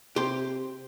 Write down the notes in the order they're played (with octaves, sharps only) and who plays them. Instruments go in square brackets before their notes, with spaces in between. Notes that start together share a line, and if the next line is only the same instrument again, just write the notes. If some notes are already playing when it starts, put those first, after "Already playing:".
[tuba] C3 [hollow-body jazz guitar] G4 C6